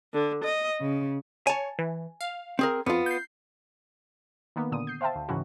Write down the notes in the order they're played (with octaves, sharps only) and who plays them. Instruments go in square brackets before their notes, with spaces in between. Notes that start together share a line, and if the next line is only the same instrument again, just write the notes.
[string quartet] D3
D#5
C#3
[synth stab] C#5 [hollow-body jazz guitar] G#5 A5
[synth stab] E3
F5
[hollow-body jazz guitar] C4 G#4 A#4
[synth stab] F2 [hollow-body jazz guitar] B3 F4
[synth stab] G6 C7
[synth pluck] D#3 A#3 B3
A#2 D3 D#6 D#7
G6 C7
C5 E5 F5 G5 A5
D2
G#2 C#3 E3 C#4 E4 F#4